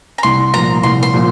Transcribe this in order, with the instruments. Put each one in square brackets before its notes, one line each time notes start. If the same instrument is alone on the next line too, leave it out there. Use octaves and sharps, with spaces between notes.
[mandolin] A#5
[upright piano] C2 [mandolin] C6
[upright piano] A#2 F3 [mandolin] A#5
[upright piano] C2 [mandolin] C6
[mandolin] C6
[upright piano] A#2 F3